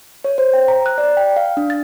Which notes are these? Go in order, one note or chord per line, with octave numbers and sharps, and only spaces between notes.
C#5
C5
G5
A#5
F#6
D5
G5
F5
D4
A6